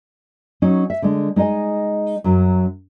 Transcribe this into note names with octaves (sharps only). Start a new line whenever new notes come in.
F#3 C#4 D#4
E5
D3 G#3
G#3 D#4 D5 D#5 G#5
F#2 F#3